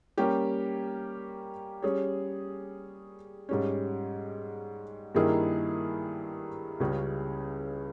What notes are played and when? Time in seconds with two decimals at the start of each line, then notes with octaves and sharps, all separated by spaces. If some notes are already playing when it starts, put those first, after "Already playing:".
0.18 G3 A#3 C#4 G4
1.82 G3 C#4 G#4 C#5
3.49 G#2 G3 C#4
5.15 G2 D#3 A#3 E4 G#4
6.80 C#2 C#3 G3 C#4 G#4